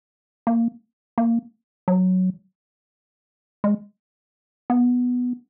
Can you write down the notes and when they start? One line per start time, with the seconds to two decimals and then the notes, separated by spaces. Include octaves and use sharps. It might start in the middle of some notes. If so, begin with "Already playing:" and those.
0.47 A#3
1.18 A#3
1.88 F#3
3.64 G#3
4.70 B3